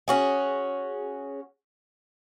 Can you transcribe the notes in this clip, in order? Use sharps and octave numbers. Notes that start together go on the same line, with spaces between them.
C#4 F#4 G#4